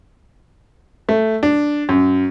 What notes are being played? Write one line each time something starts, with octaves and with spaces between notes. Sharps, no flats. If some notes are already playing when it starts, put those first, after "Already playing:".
A3
D4
F#2